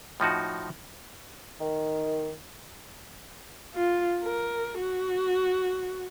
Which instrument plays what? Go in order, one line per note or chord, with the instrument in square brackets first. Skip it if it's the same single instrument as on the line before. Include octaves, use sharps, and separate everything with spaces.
[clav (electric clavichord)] A2 F3 D#4 F#4
[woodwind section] D#3
[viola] F4
A#4
F#4